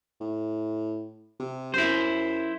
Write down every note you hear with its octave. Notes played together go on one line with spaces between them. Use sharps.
A2
C3
F#2 E4 C5